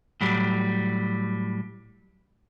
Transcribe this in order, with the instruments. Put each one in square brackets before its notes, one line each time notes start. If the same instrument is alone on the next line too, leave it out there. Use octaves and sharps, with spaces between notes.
[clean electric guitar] A2 F#3 G3